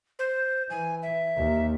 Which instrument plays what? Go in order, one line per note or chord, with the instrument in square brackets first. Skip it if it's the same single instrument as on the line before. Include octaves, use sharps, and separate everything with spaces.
[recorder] C5
[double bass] E3 [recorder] G#5
[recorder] E5
[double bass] D#2